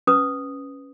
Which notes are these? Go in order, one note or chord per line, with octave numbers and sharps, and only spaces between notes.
C#4 B4 D#6